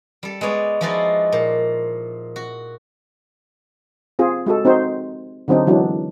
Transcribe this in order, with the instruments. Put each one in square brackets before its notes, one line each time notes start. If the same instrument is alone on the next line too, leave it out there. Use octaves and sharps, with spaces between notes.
[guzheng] G3 A4
G#3 B3 C#5 D5
F3 G#3 D#4 E4 F#4 D5
A#2
F#4
[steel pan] C4 F4 G#4
G#3 F#4 A4
C4 D#4 F#4 C5
D3 F#3 C4 D4 D#4
E3 F#3 G#3 D4